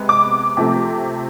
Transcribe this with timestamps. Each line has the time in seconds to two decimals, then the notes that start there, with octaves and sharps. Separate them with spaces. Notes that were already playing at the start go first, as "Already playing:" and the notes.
Already playing: C3 G#3 B3
0.09 D6
0.57 C3 F3 A3 C4